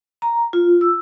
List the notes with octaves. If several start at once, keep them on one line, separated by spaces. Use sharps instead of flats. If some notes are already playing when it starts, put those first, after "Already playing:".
A#5
F4
E6